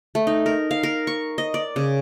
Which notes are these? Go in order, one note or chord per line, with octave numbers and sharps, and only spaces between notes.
A3
D#4
A#4
F5
A#4
C#6
D#5
D5
C#3